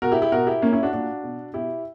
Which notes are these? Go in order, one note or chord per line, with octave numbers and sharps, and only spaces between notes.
B2 F#4 A#4
E4 G4
E4 G4
B2 F#4 A#4
E4 G4
A#2 A#3 C#4
C#4 E4
D4 F#4
A#2 D4 F#4
B2
B2 E4 G4